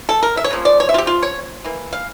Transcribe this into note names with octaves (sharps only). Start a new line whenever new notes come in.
A4
A#4
E5
C#5
C#3 F3 A#3
D5
C#5
E5
F4
G4
F4
C#5
E3 A#3
F5